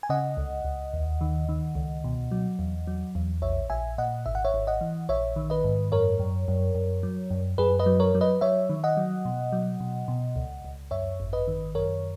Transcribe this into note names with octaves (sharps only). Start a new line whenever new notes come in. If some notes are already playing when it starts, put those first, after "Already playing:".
G#5
C#3 D#5 F#5
C#2
C#2
D#2
D#3
D#3
C#2
B2
F#3
E2
F#3
E2
A#1 C#5 E5
A#1 E5 G#5
A#2 D#5 F#5
G#1 E5
F#5
C#5 E5
G#1
D#5 F#5
E3
A#1 C#5 E5
D#3
B4 D#5
G#2
F#2 A#4 C#5
F#2
F#2
F#2
F#3
F#2
F#2 G#4 B4
B4 D#5
F#3
A#4 C#5
F#3
B4 D#5
F#3 C#5 E5
D#3
D#5 F#5
F#3
B2
F#3
B2
B2
C#2
C#2
F#2 C#5 E5
G#1
B4 D#5
D#3
F#2 A#4 C#5